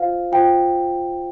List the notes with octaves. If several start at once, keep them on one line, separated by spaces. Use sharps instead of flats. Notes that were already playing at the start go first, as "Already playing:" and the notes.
Already playing: F4 C5 F5
F4 C5 G5